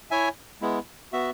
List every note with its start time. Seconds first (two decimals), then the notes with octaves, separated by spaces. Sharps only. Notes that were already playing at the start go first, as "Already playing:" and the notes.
0.11 E4 C#5 E5 G#5
0.61 G#3 B3 E4
1.13 B3 F#4 E5